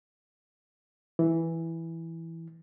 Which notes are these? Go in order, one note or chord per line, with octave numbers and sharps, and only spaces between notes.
E3